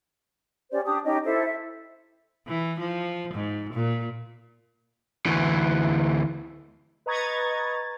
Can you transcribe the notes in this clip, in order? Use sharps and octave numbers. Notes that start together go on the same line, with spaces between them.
C#4 G4 C5 D5
D4 G4 D#6
C#4 D#4 G4 D#5
E4 A4 C5 E5
E5
E3
F3
G#2
A#2
D2 E3
B4 D#5 A#5 C#6 G#6 A6